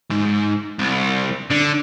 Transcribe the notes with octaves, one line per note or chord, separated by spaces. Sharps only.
G#2
C2
D3